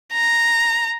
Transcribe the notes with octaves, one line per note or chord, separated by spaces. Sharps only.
A#5